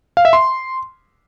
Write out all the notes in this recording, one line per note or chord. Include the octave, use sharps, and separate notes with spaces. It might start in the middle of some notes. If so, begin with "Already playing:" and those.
F5
E5
C6